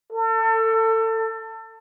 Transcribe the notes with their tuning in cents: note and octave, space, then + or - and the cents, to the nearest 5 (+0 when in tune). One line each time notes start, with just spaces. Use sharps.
A4 +30